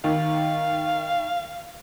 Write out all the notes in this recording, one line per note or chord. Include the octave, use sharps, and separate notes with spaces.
D#3 F5